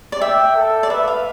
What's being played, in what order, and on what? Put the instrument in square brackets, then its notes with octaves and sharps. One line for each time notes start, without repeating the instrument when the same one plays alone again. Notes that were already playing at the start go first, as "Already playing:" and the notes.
[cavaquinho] D5
[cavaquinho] E5 [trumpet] G5
[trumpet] A4
[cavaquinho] D5
[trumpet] B4 [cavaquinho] E5
[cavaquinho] F5